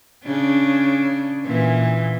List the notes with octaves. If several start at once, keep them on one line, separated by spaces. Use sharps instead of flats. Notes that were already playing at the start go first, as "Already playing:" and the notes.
C#3 D4
A#2 E3